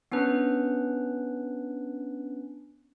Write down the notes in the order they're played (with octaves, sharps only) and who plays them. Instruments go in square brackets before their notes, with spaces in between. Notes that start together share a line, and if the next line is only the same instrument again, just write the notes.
[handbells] B3 C#4 D4 B4